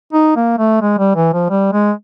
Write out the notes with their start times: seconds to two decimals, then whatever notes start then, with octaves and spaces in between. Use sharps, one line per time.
0.13 D#4
0.36 A#3
0.58 A3
0.81 G#3
0.98 G3
1.15 E3
1.33 F3
1.50 G3
1.73 G#3